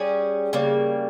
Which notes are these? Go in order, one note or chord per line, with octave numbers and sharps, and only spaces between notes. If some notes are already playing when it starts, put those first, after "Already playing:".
Already playing: G3 C#4 G#4
C#3 G3 A#3